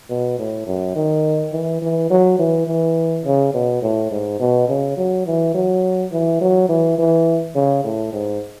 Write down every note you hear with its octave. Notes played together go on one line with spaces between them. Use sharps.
B2
A2
F#2
D#3
E3
E3
F#3
E3
E3
C#3
B2
A2
G#2
B2
C#3
F#3
E3
F#3
E3
F#3
E3
E3
C#3
A2
G#2